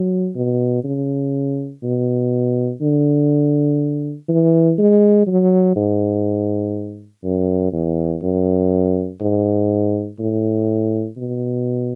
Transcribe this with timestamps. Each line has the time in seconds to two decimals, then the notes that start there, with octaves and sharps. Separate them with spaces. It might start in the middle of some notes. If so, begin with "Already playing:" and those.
Already playing: F#3
0.35 B2
0.84 C#3
1.83 B2
2.81 D3
4.29 E3
4.78 G#3
5.27 F#3
5.76 G#2
7.24 F#2
7.73 E2
8.22 F#2
9.21 G#2
10.19 A2
11.17 B2